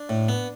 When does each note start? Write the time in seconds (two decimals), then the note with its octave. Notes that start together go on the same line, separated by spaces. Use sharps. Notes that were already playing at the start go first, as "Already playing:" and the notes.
Already playing: D4
0.09 A2
0.29 B3